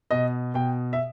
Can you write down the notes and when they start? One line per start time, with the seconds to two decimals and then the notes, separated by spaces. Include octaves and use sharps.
0.11 B2 D#5
0.54 B2 G5
0.93 E5